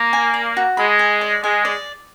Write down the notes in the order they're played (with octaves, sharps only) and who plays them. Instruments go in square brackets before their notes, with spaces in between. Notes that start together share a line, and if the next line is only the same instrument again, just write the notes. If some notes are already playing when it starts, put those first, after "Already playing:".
Already playing: [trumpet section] A#3
[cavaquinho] G#5
D5
F#4
[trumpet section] G#3 [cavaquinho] B5
[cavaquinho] G#5
D5
[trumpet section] G#3 [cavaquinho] G#5
[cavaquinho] D5